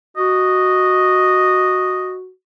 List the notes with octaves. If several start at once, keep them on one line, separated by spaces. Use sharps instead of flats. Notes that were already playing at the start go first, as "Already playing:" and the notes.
F#4 D#5